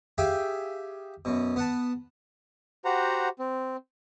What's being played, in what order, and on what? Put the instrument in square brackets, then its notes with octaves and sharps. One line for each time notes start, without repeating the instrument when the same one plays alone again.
[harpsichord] G4 G#4 E5 F5 G5 D6
F#2 B2
B3 F#5 A5
[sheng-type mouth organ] F#4 G4 C5 F#5 A#5
C4